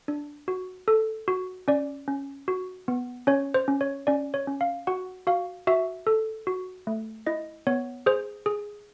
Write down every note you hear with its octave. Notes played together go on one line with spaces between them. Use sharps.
D4
F#4
A4
F#4
C#4 D5
C#4
F#4
B3
C#4 C#5
C5
C#4
C#5
C#4 D5
C#5
C#4
F5
F#4 F#5
F#4 F5
F#4 E5
A4
F#4
A3
E4 D#5
B3 C#5
G#4 C5
G#4